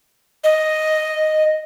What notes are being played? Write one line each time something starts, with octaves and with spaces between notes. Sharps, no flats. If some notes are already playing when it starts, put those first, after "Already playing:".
D#5